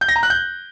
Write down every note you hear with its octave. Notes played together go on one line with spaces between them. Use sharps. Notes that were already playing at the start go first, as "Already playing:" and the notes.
G6
A#6
A#5
F#6
G6